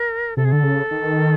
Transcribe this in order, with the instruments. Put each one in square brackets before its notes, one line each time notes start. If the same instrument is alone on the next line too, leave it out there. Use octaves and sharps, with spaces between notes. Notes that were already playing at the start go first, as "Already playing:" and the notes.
Already playing: [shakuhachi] A#4
[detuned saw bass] C3 [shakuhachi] A4
[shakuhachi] G#4
[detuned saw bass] D3 [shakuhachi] A4
[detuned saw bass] C#3
D#3